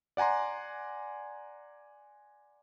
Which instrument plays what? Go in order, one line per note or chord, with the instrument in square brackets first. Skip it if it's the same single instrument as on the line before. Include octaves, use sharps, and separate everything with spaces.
[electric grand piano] D5 F#5 G#5 A#5 C6